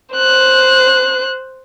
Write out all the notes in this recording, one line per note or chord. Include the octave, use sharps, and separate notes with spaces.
C5 F#6